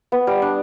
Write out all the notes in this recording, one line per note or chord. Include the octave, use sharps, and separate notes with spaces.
B3
G3
D4